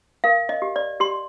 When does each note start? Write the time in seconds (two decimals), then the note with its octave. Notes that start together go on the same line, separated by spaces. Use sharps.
0.24 A#4 F5
0.49 D#5
0.62 G4
0.76 D5
1.00 G4 C6